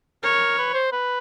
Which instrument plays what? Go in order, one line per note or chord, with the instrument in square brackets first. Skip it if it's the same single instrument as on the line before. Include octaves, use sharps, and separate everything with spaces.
[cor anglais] A#4 [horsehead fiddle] C#5
[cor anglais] B4
C5
B4